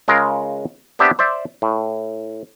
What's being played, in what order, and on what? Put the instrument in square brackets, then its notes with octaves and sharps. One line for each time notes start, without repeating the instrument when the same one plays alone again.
[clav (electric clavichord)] C#3 G#3 F4 A#4
B3 C4 D4 G4 D5 E5
C5 D5 E5
A2